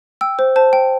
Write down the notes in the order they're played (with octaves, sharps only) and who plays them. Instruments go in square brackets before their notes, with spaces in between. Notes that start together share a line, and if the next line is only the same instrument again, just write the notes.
[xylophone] G5 E6
C5
C5 A5
G5